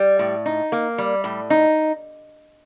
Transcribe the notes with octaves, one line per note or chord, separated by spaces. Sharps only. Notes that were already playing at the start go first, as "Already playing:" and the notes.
Already playing: G3
A2
D#4
A#3
G3
A2
D#4